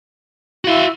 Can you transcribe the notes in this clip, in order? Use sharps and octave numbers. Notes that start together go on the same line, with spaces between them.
E4 F#4 F5